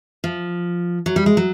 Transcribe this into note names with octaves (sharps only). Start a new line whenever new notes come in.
F3
F#3
G3
G#3
F#3